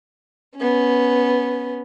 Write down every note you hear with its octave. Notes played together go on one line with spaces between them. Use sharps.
B3 C#4